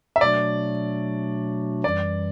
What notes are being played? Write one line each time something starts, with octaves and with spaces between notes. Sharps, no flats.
E5
B2 F#3 A3 D4 F#4 D5
F#2 E3 G3 D5